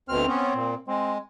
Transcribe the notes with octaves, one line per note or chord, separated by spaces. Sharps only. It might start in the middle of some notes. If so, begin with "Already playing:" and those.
D2 B2 C4 F6
B3 C#4
A#2
G#3 C4